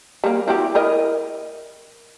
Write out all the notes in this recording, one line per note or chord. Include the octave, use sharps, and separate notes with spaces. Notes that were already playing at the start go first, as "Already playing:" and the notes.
G3 A#3
E4 F#4 G4
E4 A#4 D#5